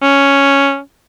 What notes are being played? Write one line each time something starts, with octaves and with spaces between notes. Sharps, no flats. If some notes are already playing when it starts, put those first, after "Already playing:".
C#4